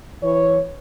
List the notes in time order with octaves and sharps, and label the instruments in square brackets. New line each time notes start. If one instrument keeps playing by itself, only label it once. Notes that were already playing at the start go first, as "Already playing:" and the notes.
[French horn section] E3 C#5